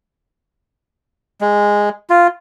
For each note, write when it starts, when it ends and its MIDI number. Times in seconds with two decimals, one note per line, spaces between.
1.41 1.89 56
2.10 2.27 65